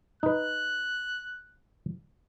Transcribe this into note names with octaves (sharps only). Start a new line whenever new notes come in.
D#4 B4 F#6